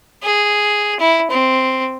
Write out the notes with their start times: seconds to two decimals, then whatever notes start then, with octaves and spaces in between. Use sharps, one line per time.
0.23 G#4
0.99 E4
1.31 C4